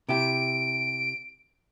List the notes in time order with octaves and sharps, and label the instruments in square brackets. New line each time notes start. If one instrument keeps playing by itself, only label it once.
[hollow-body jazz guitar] C3 E4 G4 [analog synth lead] D7